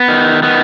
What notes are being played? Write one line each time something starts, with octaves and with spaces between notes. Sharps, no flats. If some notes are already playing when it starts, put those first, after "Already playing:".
Already playing: B3
D#3
D#3 B3